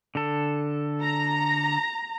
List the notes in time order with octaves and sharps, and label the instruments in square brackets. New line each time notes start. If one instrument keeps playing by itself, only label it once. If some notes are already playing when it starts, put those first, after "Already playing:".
[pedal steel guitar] D3 A4
[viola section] A#5